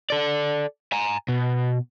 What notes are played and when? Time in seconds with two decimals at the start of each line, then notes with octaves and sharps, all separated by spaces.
0.10 A4 D5
0.92 G#5 A#5
1.28 B2